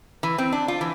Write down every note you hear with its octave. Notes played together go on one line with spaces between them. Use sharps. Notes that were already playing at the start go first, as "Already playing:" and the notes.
E3
C4
D4
F4
E3